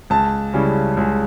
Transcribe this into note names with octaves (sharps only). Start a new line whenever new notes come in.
C#2 A5
C#3 G3 C#4 E4
C#2